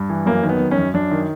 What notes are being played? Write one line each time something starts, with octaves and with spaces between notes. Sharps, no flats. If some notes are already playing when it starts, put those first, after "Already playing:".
Already playing: G2
E3
F#2 A#3
D#3
B3
F#2
C#4
F#2
F#2 D4
D#3